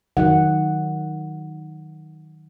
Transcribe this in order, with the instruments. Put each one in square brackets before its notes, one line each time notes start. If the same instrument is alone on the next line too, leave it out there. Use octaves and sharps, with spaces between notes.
[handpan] D#3 F#3 F#5